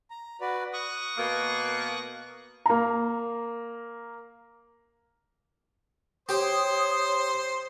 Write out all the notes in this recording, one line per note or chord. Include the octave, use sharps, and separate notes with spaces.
A#5
F#4 B4 D5
C#6 D#6 F#6
B2 A#3
A#3 A#5
G4 C5 C#5 C6 D#6